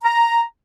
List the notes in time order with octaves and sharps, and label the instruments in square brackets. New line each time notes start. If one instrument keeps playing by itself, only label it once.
[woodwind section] A#5